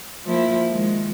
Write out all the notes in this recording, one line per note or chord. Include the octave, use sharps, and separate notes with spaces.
F3 A#3 E4
D#3 F3 G#3